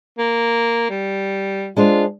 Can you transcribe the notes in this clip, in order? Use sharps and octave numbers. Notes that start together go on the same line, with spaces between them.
A#3
G3
G#3 D4 F4 C5